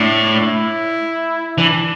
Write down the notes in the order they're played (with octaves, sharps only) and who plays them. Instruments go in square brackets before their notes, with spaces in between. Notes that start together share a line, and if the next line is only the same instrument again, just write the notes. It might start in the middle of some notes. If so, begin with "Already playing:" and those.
Already playing: [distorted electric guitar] A2 [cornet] D4
[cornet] E4
[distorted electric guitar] E3 [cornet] D4